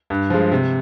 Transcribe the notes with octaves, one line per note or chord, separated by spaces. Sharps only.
G2
F3 G#3
C3